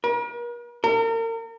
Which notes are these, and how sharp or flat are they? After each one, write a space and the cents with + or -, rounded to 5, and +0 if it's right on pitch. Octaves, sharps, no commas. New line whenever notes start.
A#4 +45
A#4 -35